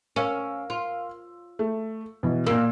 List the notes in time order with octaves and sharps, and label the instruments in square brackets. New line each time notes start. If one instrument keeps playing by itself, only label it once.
[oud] C#4 [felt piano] A#4 F5 E6
[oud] F4
[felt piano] A3
B2 E3
[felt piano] A#2 E6 [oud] A#3